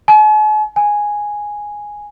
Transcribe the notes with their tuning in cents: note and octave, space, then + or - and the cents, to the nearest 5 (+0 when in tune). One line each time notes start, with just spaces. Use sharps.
G#5 +45
G#5 +0